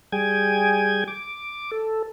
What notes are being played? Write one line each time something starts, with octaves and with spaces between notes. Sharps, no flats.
G3 G#4 G5 G#5 G#6
D6
A4